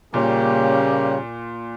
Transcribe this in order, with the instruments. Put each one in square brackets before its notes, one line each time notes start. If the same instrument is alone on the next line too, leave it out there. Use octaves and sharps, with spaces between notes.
[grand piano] A#2 [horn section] C#3 G3 A#3 C#4 G4